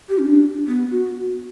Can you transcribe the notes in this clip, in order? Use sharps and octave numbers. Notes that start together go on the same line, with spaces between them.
G4
C#4
D4
B3
F#4